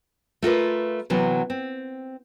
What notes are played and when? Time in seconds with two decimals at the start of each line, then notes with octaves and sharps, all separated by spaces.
0.42 A3 F4 A#4 B4
1.10 C3 E3 F#3 B3
1.50 C4